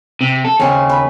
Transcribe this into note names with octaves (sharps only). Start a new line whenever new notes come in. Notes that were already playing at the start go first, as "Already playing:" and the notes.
C3
A4
D#2 C#3 C4 C#4
B4